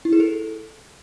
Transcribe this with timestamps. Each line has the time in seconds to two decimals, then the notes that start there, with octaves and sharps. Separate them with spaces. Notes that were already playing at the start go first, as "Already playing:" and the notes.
0.05 E4
0.13 G#4
0.20 A4